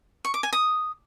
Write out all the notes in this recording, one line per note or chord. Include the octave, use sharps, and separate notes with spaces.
C#6
D6
G#5
D#6